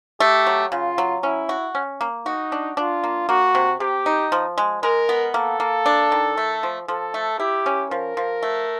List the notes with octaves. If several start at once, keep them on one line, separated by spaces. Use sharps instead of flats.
A3 G4
F#3
C#3 F4
F#3
C#4 E4
F#4
C#4
A#3
D#4 F#4
D4
D4 F4
A#3
A#3 F#4
C3
C3 G4
D#4
F3
G#3
G#3 A#4
B3
A#3 A4
A#3
D4
D#3
A3
F3
F3 A4
A3
E4 G4
C#4
F3 A#4
F3
A3